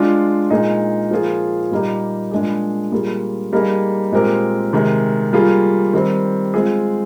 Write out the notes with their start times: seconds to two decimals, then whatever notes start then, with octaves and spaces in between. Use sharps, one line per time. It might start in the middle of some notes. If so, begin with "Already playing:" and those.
Already playing: G#3 D4 F4
0.50 A#2 G#3 D#4 G#4
1.11 F3 A#3 F4 G#4
1.71 A#2 G3 A#3 D#4 G4
2.31 A#2 G#3 D4 G#4
2.91 A#2 G3 A#3 F4 G#4
3.53 G3 A#3 D#4 G#4
4.12 A#2 G#3 C4 G4 A#4
4.73 C3 D#3 G#3
5.33 G3 A#3 F4 G#4
5.93 D#3 G3 C4
6.54 G#3 C4 F4 G#4